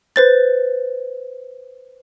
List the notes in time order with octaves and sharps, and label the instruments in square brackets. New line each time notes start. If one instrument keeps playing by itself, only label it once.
[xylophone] B4 C5 A6